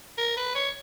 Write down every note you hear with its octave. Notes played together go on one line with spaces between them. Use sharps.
A#4
B4
C#5